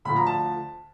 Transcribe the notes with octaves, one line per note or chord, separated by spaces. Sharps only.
D2 D3 F3 B5
A#5
A5